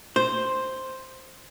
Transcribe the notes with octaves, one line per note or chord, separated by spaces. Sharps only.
C5